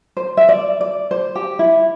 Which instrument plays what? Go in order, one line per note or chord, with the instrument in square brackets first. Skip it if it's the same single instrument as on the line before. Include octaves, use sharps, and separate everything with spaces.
[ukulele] C5
E5
D5
D5
C5
G4
E4